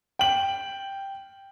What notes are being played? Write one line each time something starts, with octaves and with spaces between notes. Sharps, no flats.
G5 F#7